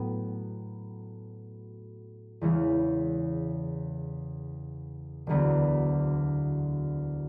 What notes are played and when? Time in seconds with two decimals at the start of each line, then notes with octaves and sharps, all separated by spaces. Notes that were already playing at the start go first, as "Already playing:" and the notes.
Already playing: A2 F#3 B3
2.41 E2 C#3 E3 G#3 C#4
5.27 E1 D2 D3 F#3 B3